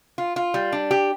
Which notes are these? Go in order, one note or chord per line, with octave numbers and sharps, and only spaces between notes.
F4
F4
G3
D4
G4